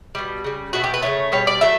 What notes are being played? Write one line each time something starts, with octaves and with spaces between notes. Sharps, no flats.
B2 G3
C#3 G3
B2 F#3 A3 F#4
G4
B4
C#3 E3 A3 C#5
B2 G3 C#5
D5
F#3 A3 E5